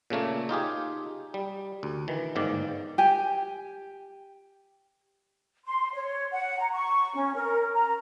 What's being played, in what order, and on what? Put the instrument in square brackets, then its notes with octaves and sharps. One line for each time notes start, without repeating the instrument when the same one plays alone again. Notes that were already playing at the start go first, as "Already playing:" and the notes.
[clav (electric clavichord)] A#2 C#3 A3 A#3
D#4 F4 G4 G#4
G3
D2
D#3 E3
G1 G#2 D#3 A#3 D5
[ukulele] G4 G#5
[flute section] C6
C#5
F#5
A#5
C#6
C#4
A#4
A#5